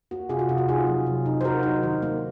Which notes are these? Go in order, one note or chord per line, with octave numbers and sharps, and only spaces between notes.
A#3 F#4
C3 F4 G#4
F#4
C3 F4
F#4
D#4 F4 G#4
F#3
C3
D#4
C5
F#3 F#4 A#4
D#4
D#3
A#3